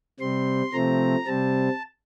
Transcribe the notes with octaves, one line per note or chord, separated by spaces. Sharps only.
C3 G3 C4 C6
C3 F3 A3 C4 A#5
C3 G3 C4 A5